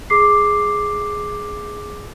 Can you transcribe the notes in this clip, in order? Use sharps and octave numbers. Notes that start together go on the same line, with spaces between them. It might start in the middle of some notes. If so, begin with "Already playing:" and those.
G#4 D6 C7